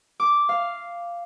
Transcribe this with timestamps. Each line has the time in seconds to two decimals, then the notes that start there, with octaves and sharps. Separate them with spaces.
0.20 D6
0.49 F5